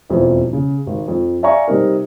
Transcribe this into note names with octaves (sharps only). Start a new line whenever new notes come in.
E1 F2 B2 F3 E4 C5
C#3
G#1
F2
D5 E5 F5 G#5 A#5 C#6
C3 G3 C4 D#4 A#4